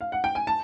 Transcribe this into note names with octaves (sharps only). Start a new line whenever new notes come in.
F5
F#5
G5
G#5
A5